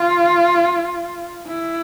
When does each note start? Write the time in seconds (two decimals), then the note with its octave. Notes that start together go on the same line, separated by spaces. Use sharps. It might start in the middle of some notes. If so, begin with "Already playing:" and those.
Already playing: F4
1.47 E4